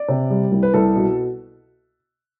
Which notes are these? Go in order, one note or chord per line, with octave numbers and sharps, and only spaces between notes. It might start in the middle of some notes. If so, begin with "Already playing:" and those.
Already playing: D5
C3
G3
C2
B4
C2 A4
B2